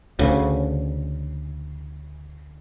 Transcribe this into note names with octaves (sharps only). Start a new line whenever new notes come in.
D2 C#3